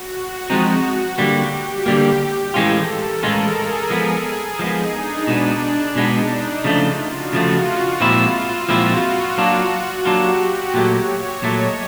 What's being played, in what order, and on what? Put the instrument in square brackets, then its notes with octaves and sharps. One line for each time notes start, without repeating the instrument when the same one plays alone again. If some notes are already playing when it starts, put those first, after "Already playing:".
Already playing: [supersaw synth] F#4
[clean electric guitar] F3 G#3 C4 D#4
[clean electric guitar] D3 G3 A#3 [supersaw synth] G4
[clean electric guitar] D3 G3 A#3
[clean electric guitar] A2 E3 G#3 C#4 F4 [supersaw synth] A4
[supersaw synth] A#4
[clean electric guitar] A2 E3 G#3 C#4 F4 [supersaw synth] G#4
[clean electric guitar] F3 G#3 B3
[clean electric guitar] F3 G#3 B3 [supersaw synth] D#4
[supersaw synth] D4
[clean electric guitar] B2 G#3 B3
[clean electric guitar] B2 G#3 B3 [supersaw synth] D#4
[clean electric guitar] C#3 F3 A3 [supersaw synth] F4
[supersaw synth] F#4
[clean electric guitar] C#3 F3 A3 [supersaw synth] F4
[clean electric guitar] A#2 F3 G#3 C4 E4 [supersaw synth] F4
[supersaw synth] F4
[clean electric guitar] A#2 F3 G#3 C4 E4 [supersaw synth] F#4
[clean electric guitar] F#3 A#3 D4 F4
[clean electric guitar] F#3 A#3 D4 F4 [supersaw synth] G4
[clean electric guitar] A#2 F#3 A3 [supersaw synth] C#5
[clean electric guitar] A#2 F#3 A3 [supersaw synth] D#5